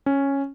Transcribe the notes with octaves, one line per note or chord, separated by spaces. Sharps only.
C#4